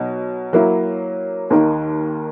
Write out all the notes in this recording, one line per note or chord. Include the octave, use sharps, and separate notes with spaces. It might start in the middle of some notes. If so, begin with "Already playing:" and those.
Already playing: B2 F#3 D#4
F#3 A#3 E4
D#2 D#3 A#3